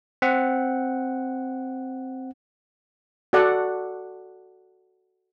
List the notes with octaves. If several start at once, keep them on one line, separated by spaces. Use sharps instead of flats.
C4 F#5
F#4 A4 D5 F#5